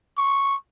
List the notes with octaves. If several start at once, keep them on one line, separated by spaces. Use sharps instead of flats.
C#6